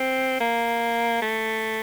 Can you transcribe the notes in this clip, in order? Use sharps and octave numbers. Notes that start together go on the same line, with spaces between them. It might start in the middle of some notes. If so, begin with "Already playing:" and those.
Already playing: C4
A#3
A3